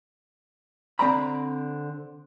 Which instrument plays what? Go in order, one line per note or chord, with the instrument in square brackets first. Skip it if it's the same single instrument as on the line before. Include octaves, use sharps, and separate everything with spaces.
[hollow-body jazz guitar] D3 C4 C5 D5 A#5 B5